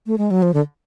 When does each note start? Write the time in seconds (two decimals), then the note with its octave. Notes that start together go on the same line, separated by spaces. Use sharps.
0.07 A3
0.18 G#3
0.31 F#3
0.42 F3
0.54 D3